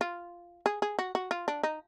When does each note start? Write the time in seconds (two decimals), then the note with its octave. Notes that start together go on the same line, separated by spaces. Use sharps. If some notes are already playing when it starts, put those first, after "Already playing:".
0.01 F4
0.66 G#4
0.82 G#4
0.99 F#4
1.15 F#4
1.31 F4
1.48 D4
1.63 D#4